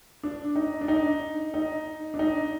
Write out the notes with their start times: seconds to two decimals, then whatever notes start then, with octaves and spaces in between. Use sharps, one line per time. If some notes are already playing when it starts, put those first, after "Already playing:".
0.23 D4
0.56 D#4
0.81 D4
0.88 D#4
1.54 D#4
2.14 D4
2.19 D#4